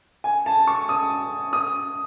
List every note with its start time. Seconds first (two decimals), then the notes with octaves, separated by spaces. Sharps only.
0.24 G#5
0.46 A5
0.67 C#6
0.89 D#6
1.53 D#6